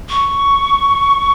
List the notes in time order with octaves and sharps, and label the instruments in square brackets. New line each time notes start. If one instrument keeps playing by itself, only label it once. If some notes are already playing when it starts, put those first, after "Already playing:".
[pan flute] C#6